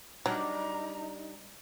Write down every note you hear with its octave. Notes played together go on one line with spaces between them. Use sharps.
F#3 G3 D4 D#4 A#5